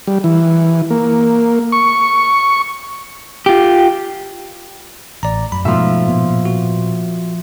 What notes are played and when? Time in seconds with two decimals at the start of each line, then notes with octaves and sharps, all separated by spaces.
0.07 G3
0.24 E3
0.90 A#3
1.72 C#6
3.46 F4 G4
5.23 A1 D5 A#5
5.52 F#2 B5
5.65 G#2 B2 F3 A3 E5
6.08 A#2 A#3 B3
6.45 F#4